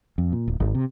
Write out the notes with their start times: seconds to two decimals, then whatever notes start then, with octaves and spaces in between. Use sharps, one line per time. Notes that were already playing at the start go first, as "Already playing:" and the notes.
0.18 F2
0.32 A#2
0.48 D1
0.60 G#1
0.75 C3